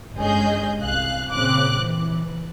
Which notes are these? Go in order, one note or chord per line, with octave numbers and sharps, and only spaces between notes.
G1 G#3 C#4 G#4 D#5 G6
C2 F5 F#6
A#2 C#3 C4 D6 F#6
E3